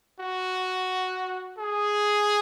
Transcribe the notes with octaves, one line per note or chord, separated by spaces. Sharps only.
F#4
G#4